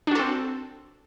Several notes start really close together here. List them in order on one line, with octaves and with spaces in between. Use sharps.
D4 F#4 A4 C4